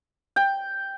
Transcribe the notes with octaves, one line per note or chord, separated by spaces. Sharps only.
G5